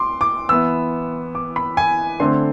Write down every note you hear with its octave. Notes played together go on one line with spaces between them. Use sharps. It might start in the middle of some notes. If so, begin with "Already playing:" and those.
Already playing: C6 D6
D6
E3 B3 E4 E6
D6
B5
G#5
D3 A3 C4 C6